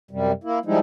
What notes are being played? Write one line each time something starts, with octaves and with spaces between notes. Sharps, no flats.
F#2 C3 G3
A#3 E4
F3 G3 G#3 D#4 E4